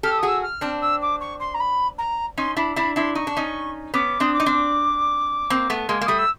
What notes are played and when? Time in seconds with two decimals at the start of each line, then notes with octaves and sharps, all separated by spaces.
0.03 G4 A4 F6
0.11 E6
0.18 D#6
0.23 F#4 G#4 E6
0.42 F6
0.61 C4 D4
0.81 E6
1.01 D6
1.20 C#6
1.40 C6
1.54 A#5
1.60 B5
1.98 A#5
2.37 C#4 D#4 C6
2.57 D4 E4 B5
2.76 D4 E4 B5
2.96 D4 E4 C6
3.15 D#4 C#6
3.27 D4
3.37 C#4 D#4
3.94 B3 C#4 D6
4.20 C4 D4 D#6
4.33 D6
4.40 D#4
4.46 C4 D4
5.50 A#3 C4
5.70 A3 B3
5.89 G#3 A#3
6.01 A#3
6.06 G3 A3 D#6
6.18 E6